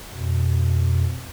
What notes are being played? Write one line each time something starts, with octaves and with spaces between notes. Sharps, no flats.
F2 B2